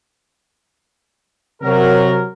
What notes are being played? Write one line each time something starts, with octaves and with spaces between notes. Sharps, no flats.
C3 F#3 A#4